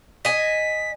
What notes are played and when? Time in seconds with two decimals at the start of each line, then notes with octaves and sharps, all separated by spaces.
0.25 D#5 G#5 B6